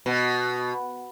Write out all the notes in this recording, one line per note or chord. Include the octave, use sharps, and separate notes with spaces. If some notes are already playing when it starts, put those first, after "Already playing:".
B2